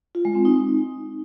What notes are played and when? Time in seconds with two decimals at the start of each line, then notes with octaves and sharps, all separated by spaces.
0.15 F4
0.25 G#3
0.35 C4
0.45 D#4